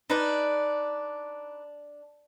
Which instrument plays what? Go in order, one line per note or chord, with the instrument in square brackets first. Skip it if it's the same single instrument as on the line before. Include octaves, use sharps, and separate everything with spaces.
[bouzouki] D4 [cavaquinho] D#4 B4 D5